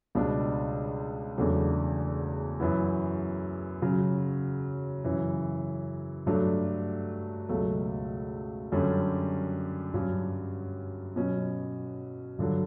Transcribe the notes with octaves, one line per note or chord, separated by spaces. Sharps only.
C#2 B2 G3 D4
E2 C#3 F#3 A3 D4
F#2 E3 B3 E4
C#3 F#3 C#4
F#2 C#3 E3
G2 F#3 A3 D4
C#2 B2 F#3 A3
F#2 D3 G3 C#4
G2 F#3 C#4
B2 F#3 C#4
G2 D3 F#3